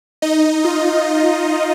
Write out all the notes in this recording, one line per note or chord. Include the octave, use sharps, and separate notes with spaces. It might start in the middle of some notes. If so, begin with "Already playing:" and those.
D#4 D#5
F4